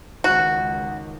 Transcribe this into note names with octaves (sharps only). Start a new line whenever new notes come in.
C#2 D#3 F#4